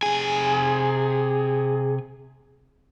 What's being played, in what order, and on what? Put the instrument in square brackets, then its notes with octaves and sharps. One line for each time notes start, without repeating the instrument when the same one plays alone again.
[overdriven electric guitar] C3 G#5 [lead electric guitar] G#4